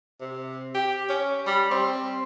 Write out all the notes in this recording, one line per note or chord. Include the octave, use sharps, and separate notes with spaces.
C3
G4
C#4
G3
C4